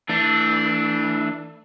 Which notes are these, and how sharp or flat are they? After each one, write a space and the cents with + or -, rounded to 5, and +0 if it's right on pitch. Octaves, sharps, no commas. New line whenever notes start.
E3 -15 A3 +30 D4 +0